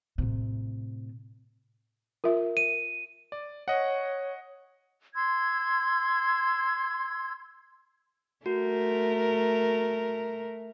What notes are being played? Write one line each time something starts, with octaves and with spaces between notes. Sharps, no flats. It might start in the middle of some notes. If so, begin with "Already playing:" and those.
A2 C3
F4 A#4 E5
D#7
D5
C#5 D#5 F#5
C6 E6 G#6
A3 F#4 A#4